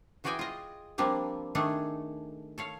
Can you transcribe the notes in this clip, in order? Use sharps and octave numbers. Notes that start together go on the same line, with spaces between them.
E3 F#4 G#4 D5 G5 G#5
F4 D#5
F3 G3 A#3 C4 D4 F4
D#3 A3 D4 G#4 A4
A4 C#5 F5